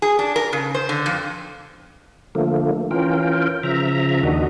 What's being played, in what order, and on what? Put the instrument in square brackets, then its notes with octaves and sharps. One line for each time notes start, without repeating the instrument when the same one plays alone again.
[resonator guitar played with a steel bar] G#4
D4
A#4
C#3
C5
D3
F2
[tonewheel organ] D3 F3 A3 A#3
E3 C#4 F4 A#4 G5
C#3 F3 E5 A#5
D#2 D#3 D4 F#4 D#5